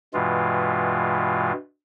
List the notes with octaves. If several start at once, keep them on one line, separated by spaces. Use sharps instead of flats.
G2 B2 E3 G#3 F4